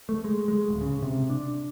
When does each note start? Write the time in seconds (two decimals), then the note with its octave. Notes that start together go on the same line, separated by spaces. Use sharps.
0.09 A3
0.24 G#3
0.48 G#3
0.68 D1
0.81 C#3
1.02 C3
1.30 D4